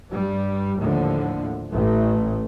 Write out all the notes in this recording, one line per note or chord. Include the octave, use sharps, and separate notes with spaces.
G2 G3
D#2 A2 D3 F3
A1 A3